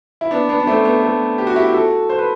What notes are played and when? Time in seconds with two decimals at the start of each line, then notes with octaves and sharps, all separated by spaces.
0.21 E4
0.31 B3 D4
0.49 B3 D4
0.60 D4
0.67 A3 C4
0.85 B3
1.03 A3
1.38 G4
1.47 F#4
1.56 E4 G4
1.69 G4
1.73 F#4 A4
2.10 C5
2.19 B4